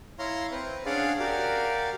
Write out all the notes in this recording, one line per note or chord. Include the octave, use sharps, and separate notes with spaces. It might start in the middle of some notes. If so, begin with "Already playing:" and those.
E4 C#5 F5 A#5 C6
C4 B4
C#4 D4 G#4 D5 F5 F#5
F#4 G4 A#4 D5 F5